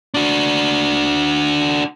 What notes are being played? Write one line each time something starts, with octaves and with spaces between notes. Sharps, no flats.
D4 F#4